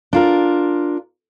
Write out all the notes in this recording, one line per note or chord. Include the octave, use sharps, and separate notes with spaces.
D4 F4 A#4